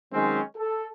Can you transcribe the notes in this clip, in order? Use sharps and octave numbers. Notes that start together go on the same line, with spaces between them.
D#3 F#3 G#3 C4 C#4
A4